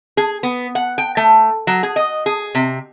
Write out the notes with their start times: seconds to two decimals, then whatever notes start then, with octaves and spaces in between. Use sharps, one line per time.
0.17 G#4
0.43 B3
0.75 F#5
0.98 G5
1.17 A3
1.67 F#3
1.83 G#4
1.96 D#5
2.26 G#4
2.55 C3